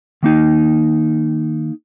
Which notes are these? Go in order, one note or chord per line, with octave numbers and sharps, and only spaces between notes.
D#3 A#3 D#4